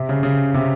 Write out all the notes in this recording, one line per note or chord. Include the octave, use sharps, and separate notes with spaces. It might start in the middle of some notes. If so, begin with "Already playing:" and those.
Already playing: C3
C#3
C#3
C3